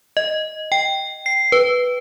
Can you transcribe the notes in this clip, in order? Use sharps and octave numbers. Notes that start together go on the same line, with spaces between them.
D#5
G5
C7
B4